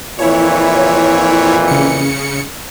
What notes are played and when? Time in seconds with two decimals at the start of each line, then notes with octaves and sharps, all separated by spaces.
0.19 F2 A#2 E3 E4 C#5
1.68 C#3 C#7